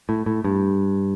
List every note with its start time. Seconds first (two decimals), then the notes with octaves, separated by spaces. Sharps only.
0.09 A2
0.26 A2
0.44 G2